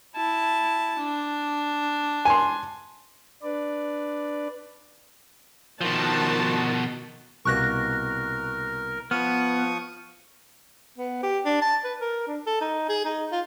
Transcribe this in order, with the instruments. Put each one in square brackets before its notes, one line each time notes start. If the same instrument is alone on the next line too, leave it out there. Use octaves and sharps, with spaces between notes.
[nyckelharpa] E4 A5
D4
[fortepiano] G#5 C6
[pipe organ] D4 B4 D5
[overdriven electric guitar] B2 F3 [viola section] D#3 F#4 A5
[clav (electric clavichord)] C2 B2 A#3 [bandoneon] A#4 [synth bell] C#6 F#6 A#6
[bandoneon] F3 C#6 D#6 [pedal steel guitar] B3 [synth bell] F6
[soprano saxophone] B3
G4
D4
A5
B4
A#4
D4
A4
D#4
G#4
D#4
F4